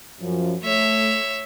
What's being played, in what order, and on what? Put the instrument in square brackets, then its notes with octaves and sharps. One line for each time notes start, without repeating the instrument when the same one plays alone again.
[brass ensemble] F#2 F3
[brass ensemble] A3 [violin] C#5 E5